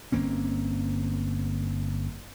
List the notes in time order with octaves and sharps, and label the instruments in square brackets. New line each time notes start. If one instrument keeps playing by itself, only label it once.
[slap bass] G1 A#3 C4 C#4